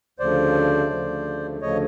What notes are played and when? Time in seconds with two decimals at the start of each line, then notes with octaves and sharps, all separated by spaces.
0.19 D2 C#3 F3 A3 C5 D5
0.90 D2 C#3 F3 A3
1.61 D2 C#3 F3 A3 C#5 D#5